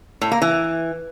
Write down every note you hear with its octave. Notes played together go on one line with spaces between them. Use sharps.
A2
A#3
E3